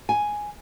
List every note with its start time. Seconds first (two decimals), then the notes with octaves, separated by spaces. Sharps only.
0.09 G#5